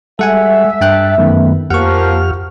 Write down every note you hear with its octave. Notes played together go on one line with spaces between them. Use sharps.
G3 G#3 A4 E5 F#5 G#5
G2 G5 A5 F#6
F#2 D#3 A3 B3
F2 F3 A#3 G4 F#5 C#6 F6